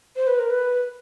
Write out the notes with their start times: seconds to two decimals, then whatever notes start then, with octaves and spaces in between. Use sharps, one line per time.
0.16 C5
0.27 B4
0.39 A#4
0.50 B4